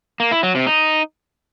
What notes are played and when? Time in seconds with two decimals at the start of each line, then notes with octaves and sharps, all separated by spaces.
0.20 A#3
0.32 E4
0.43 F#3
0.55 C3
0.67 D#4